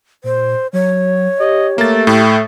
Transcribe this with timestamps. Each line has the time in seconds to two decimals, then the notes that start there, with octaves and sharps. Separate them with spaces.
0.24 A#2 C5
0.73 F#3 C#5
1.40 G4 D#5
1.78 A3 A#3 A6
2.07 A2 G5